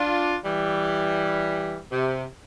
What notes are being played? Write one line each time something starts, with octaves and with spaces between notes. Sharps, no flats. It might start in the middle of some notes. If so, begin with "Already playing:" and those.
Already playing: D4 F4
E3 G3
C3